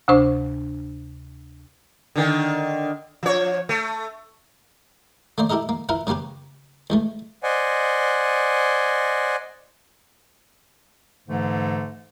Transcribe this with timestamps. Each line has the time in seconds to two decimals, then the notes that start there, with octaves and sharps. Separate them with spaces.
0.08 D2 C3 D4 C5 C#6
2.16 D3 D#3
3.23 F3 C#5
3.69 A3
5.38 A3 A#3 C5 D5
5.50 E4 G4 A4 A#4 D#5
5.69 A#3
5.89 E4 F4 A#4 B4
6.07 C#3 A#3 C#4 G4 B4
6.90 E2 G#3 A3
7.43 C5 D5 D#5 F#5 G#5
11.28 G#2 D3 E3 A3